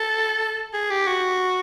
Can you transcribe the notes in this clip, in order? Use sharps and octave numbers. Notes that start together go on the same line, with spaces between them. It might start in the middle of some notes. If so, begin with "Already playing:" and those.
Already playing: A4
G#4
G4
F#4